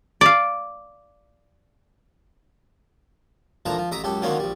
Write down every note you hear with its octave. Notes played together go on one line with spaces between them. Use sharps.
D5 F5
D2 A#2 E3 F3 A5 A#5
F3
A1 E5 A#5 D6 D#6
C#2 F#2 G4 A4
D3 D#3 F#3 A#3 C4 C#4
A#1 G3